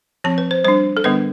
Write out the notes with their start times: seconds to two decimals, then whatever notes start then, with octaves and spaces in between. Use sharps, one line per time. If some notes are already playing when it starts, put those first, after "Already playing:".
0.24 F3 C4 A5
0.38 B4
0.51 C5
0.64 G3 D4 C5
0.97 A4
1.04 D3 G3 B3 D4 B4